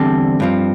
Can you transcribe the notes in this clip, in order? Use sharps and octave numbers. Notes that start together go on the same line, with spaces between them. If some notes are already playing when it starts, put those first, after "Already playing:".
Already playing: E2 D3 G3 C4 A4
G2 F3 C4